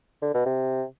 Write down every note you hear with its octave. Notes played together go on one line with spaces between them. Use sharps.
D3
B2
C3